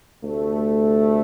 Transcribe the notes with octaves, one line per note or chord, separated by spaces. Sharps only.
D2 C3 A3